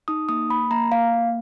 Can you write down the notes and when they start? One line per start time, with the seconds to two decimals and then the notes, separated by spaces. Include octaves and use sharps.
0.08 D#4 D#6
0.29 A#3 D#6
0.50 A#3 B5
0.71 A#3 A#5
0.92 A#3 F5
1.13 A#3